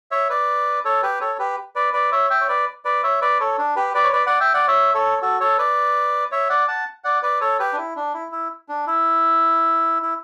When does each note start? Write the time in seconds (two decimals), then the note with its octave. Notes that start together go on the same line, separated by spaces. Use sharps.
0.11 C#5 E5
0.30 B4 D5
0.85 A4 C#5
1.03 G4 B4
1.21 A4 C#5
1.39 G4 B4
1.76 B4 D5
1.93 B4 D5
2.12 C#5 E5
2.30 E5 G5
2.41 C#5
2.48 B4 D5
2.85 B4 D5
3.03 C#5 E5
3.22 B4 D5
3.40 A4 C#5
3.58 D4
3.76 G4 B4
3.94 B4 D5
4.04 C#5
4.13 B4 D5
4.27 D5 F#5
4.40 E5 G5
4.54 D5 F#5
4.67 C#5 E5
4.94 A4 C#5
5.22 F#4 A4
5.41 A4 C#5
5.58 B4 D5
6.32 C#5 E5
6.50 D5 F#5
6.68 F#5 A5
7.04 D5 F#5
7.23 B4 D5
7.41 A4 C#5
7.60 G4 B4
7.73 D4
7.77 E4
7.96 D4
8.14 E4
8.32 E4
8.69 D4
8.87 E4
10.02 E4